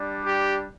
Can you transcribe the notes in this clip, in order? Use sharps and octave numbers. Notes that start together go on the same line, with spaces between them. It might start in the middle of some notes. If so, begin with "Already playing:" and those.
Already playing: G3 D4
G4